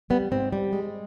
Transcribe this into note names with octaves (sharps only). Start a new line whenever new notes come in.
G3 B3
G#2 C4
G3
G#3